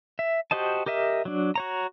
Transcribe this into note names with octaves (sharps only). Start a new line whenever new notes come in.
E5
F#4 G4 C5 D#5 A5
G4 A#4 D#5 E5
F#3 D4
F#4 C#5 A#5